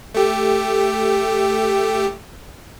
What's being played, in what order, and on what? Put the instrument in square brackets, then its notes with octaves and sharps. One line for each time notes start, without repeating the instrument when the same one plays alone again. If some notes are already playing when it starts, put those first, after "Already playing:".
[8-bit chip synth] A3 G4